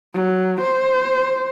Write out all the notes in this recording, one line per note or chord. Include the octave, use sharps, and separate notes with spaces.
F#3
C5